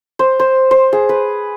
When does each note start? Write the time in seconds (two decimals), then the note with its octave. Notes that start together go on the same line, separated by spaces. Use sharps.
0.19 C5
0.40 C5
0.71 C5
0.93 G#4
1.09 B4